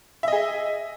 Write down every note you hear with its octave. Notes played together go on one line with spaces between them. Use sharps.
G#4 D#5 E5